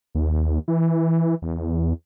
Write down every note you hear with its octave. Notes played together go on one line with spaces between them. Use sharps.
D#2
E3
E2